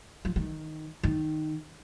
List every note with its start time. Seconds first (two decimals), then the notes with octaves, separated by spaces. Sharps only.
0.25 F3
0.36 D#3
1.03 D#3